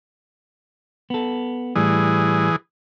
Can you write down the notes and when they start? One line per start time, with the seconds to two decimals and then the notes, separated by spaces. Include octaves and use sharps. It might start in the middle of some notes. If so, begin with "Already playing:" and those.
1.10 B3 A4
1.76 A2 E3 G3 G#4